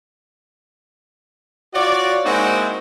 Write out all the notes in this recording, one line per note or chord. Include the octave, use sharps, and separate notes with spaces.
F4 F#4 C#5 D5
G#3 A#3 C4 D#4 E4 F#4